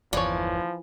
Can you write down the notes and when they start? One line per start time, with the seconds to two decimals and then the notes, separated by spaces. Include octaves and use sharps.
0.13 G1 E2 E3 F3 C#5 D5